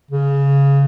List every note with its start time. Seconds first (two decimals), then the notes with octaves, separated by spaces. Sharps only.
0.11 C#3